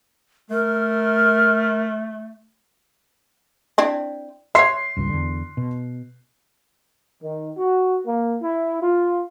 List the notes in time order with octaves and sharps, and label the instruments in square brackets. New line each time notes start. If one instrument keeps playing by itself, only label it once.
[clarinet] A3 [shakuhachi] A#4
[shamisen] C4 D4 E4
[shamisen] C#5 E5 [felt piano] C6 C7
[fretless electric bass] D#1 C#2 G2
E2 D3
B2
[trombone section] D#3
F#4
A#3
E4
F4